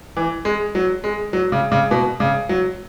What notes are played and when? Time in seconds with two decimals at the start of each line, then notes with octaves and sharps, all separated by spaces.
0.17 E3
0.45 G#3
0.75 F#3
1.04 G#3
1.33 F#3
1.52 C#3
1.72 C#3
1.91 B2
2.20 C#3
2.49 F#3